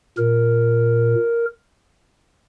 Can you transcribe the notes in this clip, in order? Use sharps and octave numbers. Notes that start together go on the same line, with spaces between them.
A#2 A#4